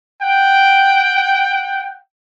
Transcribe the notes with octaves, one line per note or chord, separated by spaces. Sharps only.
F#5 G5